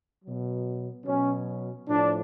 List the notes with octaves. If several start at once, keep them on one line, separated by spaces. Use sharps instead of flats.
B2 F#3
B2 F#3 C#4
A2 F3 D4